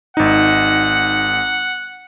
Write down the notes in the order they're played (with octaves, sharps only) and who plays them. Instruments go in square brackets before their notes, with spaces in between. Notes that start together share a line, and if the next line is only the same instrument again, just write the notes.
[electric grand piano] G#1 D#4 [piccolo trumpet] F#5